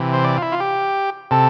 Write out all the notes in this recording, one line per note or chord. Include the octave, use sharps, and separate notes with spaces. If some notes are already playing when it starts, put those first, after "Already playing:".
Already playing: C3 E3
C5
D5
F4
E4
F4
G4
C3 A4